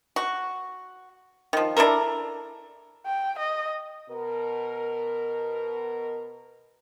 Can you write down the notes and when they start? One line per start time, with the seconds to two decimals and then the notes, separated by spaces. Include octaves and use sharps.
0.16 F#4
1.53 D#3 F3
1.77 D4 E4 A4 A#4
3.06 G5
3.39 D#5
4.10 B2 A#4